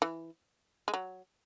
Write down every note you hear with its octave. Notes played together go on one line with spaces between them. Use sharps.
E3
G#3
F#3